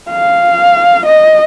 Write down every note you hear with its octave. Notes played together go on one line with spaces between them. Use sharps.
F5
D#5